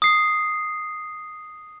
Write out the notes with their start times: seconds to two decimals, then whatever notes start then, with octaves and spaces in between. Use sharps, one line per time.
0.02 D#6 C7